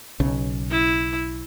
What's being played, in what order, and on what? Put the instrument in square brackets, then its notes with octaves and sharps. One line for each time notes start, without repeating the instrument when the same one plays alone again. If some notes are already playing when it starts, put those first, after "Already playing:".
[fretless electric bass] B1 C#3
[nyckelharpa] E4